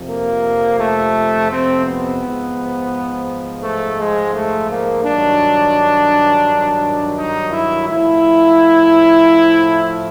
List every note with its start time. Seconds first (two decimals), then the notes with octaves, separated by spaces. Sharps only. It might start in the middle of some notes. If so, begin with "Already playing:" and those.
Already playing: F2 C3 F3
0.09 A#3
0.80 A3
1.51 C4
1.86 B3
2.22 G#2 F3
3.63 A3
3.99 G#3
4.34 A3
4.70 A#3
5.04 G2 D#3 F#3 D4
7.17 D#4
7.53 E4
7.88 A2 F3 E4